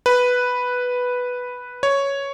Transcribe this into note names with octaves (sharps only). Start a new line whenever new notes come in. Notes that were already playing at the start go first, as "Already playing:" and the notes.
B4
C#5